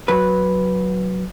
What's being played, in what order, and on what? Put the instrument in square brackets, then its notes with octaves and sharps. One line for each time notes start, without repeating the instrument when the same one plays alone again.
[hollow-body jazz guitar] F#3 B4